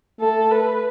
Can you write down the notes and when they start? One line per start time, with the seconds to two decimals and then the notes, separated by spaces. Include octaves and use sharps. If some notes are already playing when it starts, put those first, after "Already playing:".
0.20 A3 A4
0.52 B4